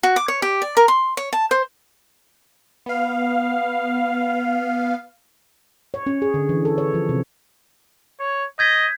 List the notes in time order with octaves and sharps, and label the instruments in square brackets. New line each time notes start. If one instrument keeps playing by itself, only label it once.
[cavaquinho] F#4
D6
C#5
G4
D5
A#4
C6
C#5
A5
C5
[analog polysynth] B3 F5
[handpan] C#5
C#4
G#4
D3
E3
A4
C#5
F3
C3
[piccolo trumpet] C#5
[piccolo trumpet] D#5 [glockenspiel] G6 G#6 B6